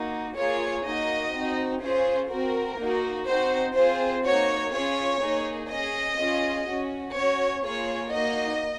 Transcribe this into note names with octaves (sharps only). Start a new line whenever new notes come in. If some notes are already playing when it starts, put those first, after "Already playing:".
Already playing: A#3 D#4 F#4
A#3 F4 G#4 C#5
A#3 D#4 F#4 D#5
C4 D#4 F#4
C#4 F4 G#4 C5
C4 F#4 A#4
A#3 D#4 F#4
C4 D#4 F#4 C5
C4 F4 G#4 C5
A#3 D#4 F#4 C#5
C#4 F4 G#4 C#5
A#3 D#4 G#4
C#4 G#4 D#5
C#4 F4 G#4
C#4 F#4
C#4 F#4 C#5
A#3 F4 G#4 C#5
A#3 D#4 F#4 D#5